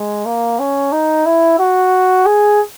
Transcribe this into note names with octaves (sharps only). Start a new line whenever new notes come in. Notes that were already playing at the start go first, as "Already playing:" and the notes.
Already playing: G#3
A#3
C#4
D#4
E4
F#4
G#4